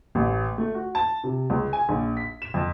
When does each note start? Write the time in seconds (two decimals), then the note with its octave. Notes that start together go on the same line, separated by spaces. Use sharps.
0.15 A1
0.58 A3
0.75 F#4
0.95 A5
1.24 C3
1.50 C#2
1.73 G#5
1.89 A#1
2.17 B6
2.42 E7
2.54 F2